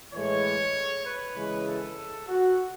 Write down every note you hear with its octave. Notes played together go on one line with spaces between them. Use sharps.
A2 E3 G#3 C#5
B4
C#3 E3 G#3
A4
F#4